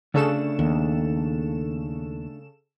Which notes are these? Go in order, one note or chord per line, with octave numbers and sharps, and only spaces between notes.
C#3 A3 D4 A4 E7
D#2